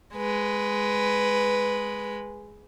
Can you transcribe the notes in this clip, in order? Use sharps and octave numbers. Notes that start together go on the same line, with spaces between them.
G#3 B4